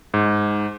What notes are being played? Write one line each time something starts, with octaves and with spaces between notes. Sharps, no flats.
G#2